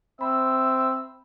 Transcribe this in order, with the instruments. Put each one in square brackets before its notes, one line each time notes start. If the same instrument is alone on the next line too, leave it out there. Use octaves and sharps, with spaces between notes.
[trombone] C4 [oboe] E5 [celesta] B5